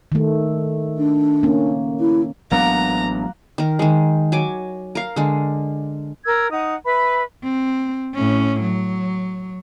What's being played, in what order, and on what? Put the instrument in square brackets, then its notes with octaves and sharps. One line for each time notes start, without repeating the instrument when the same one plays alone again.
[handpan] D#3 A3
[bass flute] D4
[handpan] A#3 C#4
[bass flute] E4
[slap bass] A1 B3 D4 [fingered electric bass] F#3 G#3 [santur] A#3 F#5 [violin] A#5
[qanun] D#3 A#4
D#3 G#3
F#3 G#5 D6
A#4 F5
D3 G#3
[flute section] A#4 E6 G#6
D#4 F#5 D#6
B4 E5 B5
[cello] C4
A2 C#4
F#3